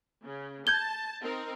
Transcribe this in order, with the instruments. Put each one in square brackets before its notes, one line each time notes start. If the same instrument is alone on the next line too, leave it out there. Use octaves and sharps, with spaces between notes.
[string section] C#3
[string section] A5 [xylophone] G6 G#6 G7
[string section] C4 D#4 A#4